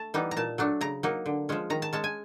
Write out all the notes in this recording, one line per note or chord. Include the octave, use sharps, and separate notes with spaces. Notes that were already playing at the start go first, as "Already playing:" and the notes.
Already playing: A3 A5
E3 G3 B3 D#4
A#5
A#2 A5
F#3 A3 D4
C#3 A#5
F#3 A#3 D#4
D3
F3 G#3 C#4
D#3 A#5
A5
G#3 C#4 A5
G#5